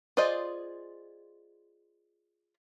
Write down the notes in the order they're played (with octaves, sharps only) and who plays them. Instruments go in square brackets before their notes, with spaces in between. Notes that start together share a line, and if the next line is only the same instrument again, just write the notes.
[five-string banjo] F4 G#4 C5 D5 D#5